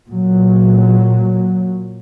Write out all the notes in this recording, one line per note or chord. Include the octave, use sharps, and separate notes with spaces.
A#2 F#3